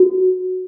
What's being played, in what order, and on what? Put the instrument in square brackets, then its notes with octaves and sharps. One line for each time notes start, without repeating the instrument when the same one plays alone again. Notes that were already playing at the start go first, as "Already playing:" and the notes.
Already playing: [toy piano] F#4